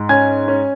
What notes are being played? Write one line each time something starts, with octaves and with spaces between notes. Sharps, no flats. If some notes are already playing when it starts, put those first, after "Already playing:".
Already playing: G#2
C#4 G#5 G#6
C#4